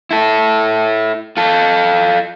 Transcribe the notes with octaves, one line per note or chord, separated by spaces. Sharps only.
E4 A4
F4 A4